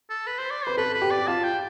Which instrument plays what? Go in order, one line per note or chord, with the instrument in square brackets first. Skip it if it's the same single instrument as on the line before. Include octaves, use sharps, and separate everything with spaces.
[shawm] A4
B4
C5
D5
[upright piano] B4 [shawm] C5
[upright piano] A4 [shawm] B4
[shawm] B4
[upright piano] G4
[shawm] D5
[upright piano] F4 [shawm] A5
[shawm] G5